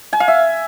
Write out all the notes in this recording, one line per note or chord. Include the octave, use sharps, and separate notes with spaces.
G#5
F5
E5